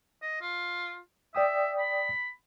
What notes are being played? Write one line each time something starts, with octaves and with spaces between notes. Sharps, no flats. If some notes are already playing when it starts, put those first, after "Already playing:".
D#5
F4
D5 E5 G5 D#6
B5